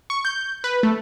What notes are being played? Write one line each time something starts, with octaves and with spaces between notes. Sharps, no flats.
C#6
G6
B4
A3